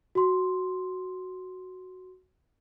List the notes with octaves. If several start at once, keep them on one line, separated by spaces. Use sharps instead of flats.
F#4 C6